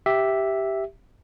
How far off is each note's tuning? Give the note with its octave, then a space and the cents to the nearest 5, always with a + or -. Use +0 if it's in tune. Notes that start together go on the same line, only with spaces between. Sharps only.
G4 -5 E5 +0